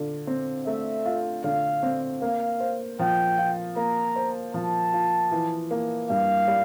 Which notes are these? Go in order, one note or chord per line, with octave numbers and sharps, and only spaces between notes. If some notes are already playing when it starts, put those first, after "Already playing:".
Already playing: D3 F4
C4
A3 E5
F4
D3 F5
C4
A#3 F5
C5
F3 G5
F4
A#3 A#5
C5
F3 A5
F4
E3
A#3
G2 F5
G3